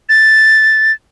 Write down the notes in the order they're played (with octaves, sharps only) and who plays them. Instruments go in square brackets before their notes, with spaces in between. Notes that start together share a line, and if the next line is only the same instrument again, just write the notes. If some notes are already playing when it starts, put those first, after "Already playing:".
[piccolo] A6